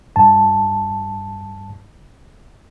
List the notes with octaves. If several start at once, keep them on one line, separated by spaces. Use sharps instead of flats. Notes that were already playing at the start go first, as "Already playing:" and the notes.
G2 A5